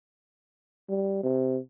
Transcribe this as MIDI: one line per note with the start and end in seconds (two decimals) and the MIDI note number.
0.89 1.21 55
1.23 1.59 48